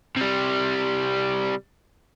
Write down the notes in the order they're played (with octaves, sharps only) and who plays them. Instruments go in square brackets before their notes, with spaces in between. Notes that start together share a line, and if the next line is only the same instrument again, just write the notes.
[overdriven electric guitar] C3 G3